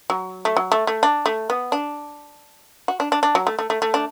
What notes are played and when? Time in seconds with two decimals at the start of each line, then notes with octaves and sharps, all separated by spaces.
0.10 F#3
0.45 A3
0.57 F#3
0.72 A3
0.87 A3
1.03 D4
1.26 A3
1.50 B3
1.72 D4
2.88 F#4
3.00 D4
3.12 D4
3.23 D4
3.35 F#3
3.47 A3
3.59 A3
3.70 A3
3.82 A3
3.94 D4